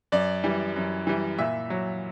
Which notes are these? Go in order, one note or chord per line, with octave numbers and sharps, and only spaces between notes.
F#2 D5
E3 G3
F#2
E3 G3
A#2 E5
F#3